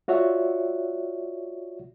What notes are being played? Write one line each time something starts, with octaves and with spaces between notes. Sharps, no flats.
F4 F#4 C#5 D5 E5 F#5